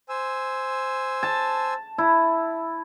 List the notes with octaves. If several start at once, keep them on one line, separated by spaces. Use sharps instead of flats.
C5 G#5 E6
A5
E4